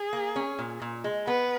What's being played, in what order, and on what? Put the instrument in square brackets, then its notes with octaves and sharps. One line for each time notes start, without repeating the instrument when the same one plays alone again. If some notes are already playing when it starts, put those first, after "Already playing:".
Already playing: [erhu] G#4
[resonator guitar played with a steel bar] A#3
C#4
A#2
A#2
G#3
[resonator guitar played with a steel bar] B3 [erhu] B4